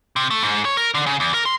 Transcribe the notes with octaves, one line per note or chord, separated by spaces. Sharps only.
C3
A3
G#2
C#5
A#4
D3
C#3
E2
A#4
C6